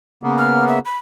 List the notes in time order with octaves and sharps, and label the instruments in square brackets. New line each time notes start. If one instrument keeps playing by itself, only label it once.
[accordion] C#3 A#3 B3
[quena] F6
E5
B5